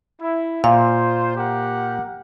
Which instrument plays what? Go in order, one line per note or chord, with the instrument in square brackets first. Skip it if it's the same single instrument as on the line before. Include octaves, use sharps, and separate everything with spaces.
[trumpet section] E4
[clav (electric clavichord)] A#2 [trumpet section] F4 C5 [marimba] F5
[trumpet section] G4 A#4 F#5